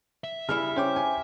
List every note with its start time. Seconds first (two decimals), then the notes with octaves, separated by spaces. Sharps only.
0.24 E5
0.49 C#3 G3 E4 G#4 F6
0.76 C#4 C5 G5 D6
0.96 G#5